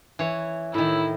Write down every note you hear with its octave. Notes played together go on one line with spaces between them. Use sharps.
E3 C#5
A2 D#3 E4